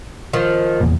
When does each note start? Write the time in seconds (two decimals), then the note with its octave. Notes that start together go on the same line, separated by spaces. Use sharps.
0.33 D#3 F3
0.80 F1 E2 A#2